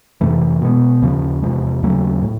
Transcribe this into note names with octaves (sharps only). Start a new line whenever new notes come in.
F2 C3 E3 A3
B2 G#3 B3
D#2 C#3 F3
E2 C3 F3 G#3
D#2 C#3 F#3 A3
A2